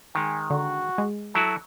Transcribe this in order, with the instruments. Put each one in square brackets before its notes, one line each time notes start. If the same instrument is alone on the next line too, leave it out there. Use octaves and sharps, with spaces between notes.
[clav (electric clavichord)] D#3 G#3 [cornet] G#5
[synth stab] D3 [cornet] F#4
[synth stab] G#3
[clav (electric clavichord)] F#3 E4 F#4 [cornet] A4